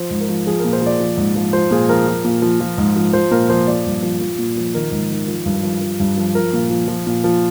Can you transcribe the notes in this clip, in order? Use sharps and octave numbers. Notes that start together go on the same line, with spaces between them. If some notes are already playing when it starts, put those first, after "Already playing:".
Already playing: F3 C5
G#2
A#4
F3
F3 G#4
A#2 A#4
C5
F3 D5
F3
G#2
F3
F3 C5
A#2 G#4
F3 A#4
F3
A#2
F3
F3
G#2
F3
F3 C5
A#2 A#4
F3 C5
F3 D5
G2
F3
F3
A#2
F3
D#3 A#4
G#2
D#3
F3
G2
F3
F3
G2
F3
F3 A#4
A#2
F3
F3
A#2
F3